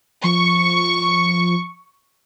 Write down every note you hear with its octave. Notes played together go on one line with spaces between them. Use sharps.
F3 C#6